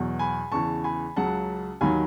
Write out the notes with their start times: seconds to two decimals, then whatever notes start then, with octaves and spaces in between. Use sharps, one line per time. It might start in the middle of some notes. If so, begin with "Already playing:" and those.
Already playing: E2 B2 F#3
0.19 G#5 B5
0.52 E2 C#3 E3 A5 C#6
0.84 G#5 B5
1.16 C#2 C#3 F#3 F#5 A5
1.81 D#2 D#3 F#3 G#5 B5